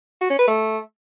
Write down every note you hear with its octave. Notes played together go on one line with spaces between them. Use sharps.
F#4
C#4
B4
A3